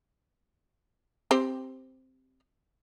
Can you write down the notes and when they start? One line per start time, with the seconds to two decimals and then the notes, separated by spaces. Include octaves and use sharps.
1.31 C4 G4 C5